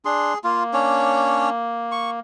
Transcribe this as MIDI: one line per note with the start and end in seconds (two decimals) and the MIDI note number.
0.05 0.34 62
0.05 0.38 68
0.05 0.34 84
0.44 2.20 58
0.44 0.63 65
0.74 1.50 61
0.74 1.50 62
0.74 1.50 73
1.92 2.10 85